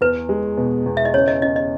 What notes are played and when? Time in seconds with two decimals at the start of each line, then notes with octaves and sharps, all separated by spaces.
0.01 E2 B4
0.29 G#3
0.57 B2
0.86 E2
0.97 E5
1.05 D#5
1.14 C#3 C#5
1.28 D#5
1.42 C#4 D#5
1.56 D#5